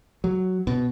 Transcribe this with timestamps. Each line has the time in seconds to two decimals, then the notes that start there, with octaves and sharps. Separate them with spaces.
0.24 F#3
0.67 B2